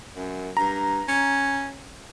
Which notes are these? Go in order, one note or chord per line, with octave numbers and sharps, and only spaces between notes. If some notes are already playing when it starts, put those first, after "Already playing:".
F#2
G2 A#5
C#4